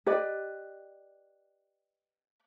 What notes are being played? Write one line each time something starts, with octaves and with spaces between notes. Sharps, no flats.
G4 B4 D5 D#5